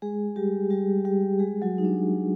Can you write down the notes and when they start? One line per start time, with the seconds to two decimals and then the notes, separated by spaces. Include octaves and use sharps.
0.02 G#3 G#4
0.36 G3 G4
0.70 G3 G4
1.05 G3 G4
1.39 G#3 G#4
1.62 F#3 F#4
1.78 D#4
1.85 D4